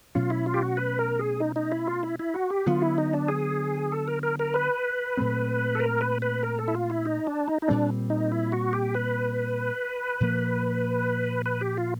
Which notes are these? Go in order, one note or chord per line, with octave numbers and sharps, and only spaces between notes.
B2 F#3 A3 C#4 F4
E4
F4
G4
F#4
B4
A#4
G#4
D#4
D#4
E4
F4
E4
E4
F#4
G4
D3 F#3 B3 F4
E4
D#4
D4
G#4
A4
A#4
A#4
A#4
B4
A#2 F#3 A3 C4
A4
A#4
B4
B4
A#4
A4
E4
F4
E4
D#4
D4
D#4
D#4
A#2 G3 C4 D4
D#4
E4
F#4
G4
B4
A#2 F3 A#3
B4
G4
F4